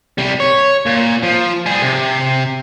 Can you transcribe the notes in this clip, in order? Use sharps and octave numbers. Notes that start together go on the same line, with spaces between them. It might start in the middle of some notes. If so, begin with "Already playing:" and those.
C3 G3
C#5
A#2
F3
G3 G#4
C3